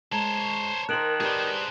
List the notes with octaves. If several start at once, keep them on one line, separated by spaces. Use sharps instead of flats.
G#3 C5 C#5 A5 A#5 E7
D#3 A#4 C5 F#6 D7 F#7
G4 G#4 B4 C5 D5